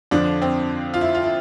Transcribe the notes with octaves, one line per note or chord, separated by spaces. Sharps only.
F2 D3 F3 D4
C4
F4
E4
F4
E4